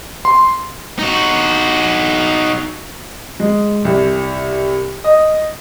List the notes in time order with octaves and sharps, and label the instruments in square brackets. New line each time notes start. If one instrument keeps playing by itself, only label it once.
[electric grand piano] C6
[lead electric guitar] D#4 F#4
[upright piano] G#3
C2
D#5